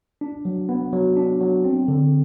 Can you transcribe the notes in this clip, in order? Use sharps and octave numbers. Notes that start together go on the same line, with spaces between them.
D4
F#3
B3
F#3
D4
F#3
C4
D3